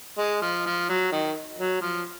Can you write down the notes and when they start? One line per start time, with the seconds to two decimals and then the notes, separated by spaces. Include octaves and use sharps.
0.18 G#3
0.42 F3
0.66 F3
0.89 F#3
1.12 D#3
1.58 F#3
1.81 F3